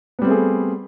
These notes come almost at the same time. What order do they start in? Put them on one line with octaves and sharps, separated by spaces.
B3 G3 C4 A3 G#4